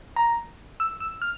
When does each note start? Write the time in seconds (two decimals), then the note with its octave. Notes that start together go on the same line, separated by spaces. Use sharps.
0.16 A#5
0.80 E6
1.00 E6
1.22 F6